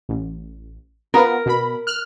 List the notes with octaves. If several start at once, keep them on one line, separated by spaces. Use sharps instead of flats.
A1
B3 F4 A#4 B4
B2 B5
F6 F#6